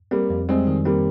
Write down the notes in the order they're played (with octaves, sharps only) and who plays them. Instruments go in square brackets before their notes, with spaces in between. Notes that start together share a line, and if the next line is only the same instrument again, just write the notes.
[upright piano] G3 A#3 [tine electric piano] C4
[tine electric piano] F2
[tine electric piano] G3 [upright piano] G#3 C4
[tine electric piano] D#3
[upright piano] G3 A#3 [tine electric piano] C4